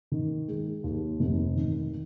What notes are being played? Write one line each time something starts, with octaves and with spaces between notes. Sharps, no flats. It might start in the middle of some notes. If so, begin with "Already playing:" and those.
D#3
G#3
D#2
F1
D#3